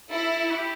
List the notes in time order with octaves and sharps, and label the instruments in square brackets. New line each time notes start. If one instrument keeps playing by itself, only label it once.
[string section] E4 [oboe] A4
[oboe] F#4
G4